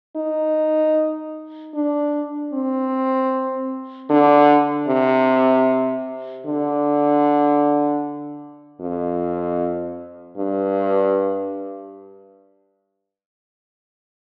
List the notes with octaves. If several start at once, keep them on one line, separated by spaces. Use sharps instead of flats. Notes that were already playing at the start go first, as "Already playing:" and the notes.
D#4
D4
C4
D3
C3
D3
F2
G2